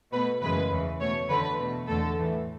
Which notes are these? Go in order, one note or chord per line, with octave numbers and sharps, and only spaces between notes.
B2 A3 B4
F#2 C#3 E3 G#3 B4
E2 C#3 E3
B2 A3 C#5
E2 D3 A3 B4
B2 A3
E2 D3 A3 A4
A2 E3 A3